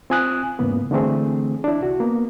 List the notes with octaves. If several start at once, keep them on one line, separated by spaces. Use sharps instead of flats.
C4 F4 G#5 D#6 F#6
E2 G#2 C#3 A#3 B3
D3 E3 A3 C4 G#4
D4 E4
C2 F#4
A#3 B3